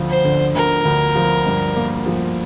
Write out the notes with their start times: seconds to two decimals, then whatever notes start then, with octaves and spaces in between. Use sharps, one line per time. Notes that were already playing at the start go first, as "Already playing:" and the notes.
Already playing: D2 F3
0.09 C5
0.25 D3
0.55 D2 A#4
0.85 D2
1.16 F3
1.46 G2
1.76 A#3
2.06 F3